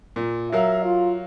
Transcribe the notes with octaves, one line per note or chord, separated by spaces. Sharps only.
A#2
F#3 A#4 E5 F5
F4